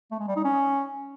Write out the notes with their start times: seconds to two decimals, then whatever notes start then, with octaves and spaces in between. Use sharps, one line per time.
0.11 A3
0.20 G#3
0.28 G3
0.36 D#4
0.45 C#4